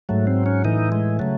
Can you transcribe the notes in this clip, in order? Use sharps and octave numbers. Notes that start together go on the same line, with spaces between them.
G#2 F#3 A3
C4
C#4
A2 E3 D#4
G#3
C#3 F#3 A3